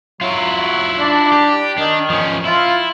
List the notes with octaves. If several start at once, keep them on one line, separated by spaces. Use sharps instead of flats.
F#3 E4 F4
D4
G4
D#3 D4
F3 C#4
E4 F4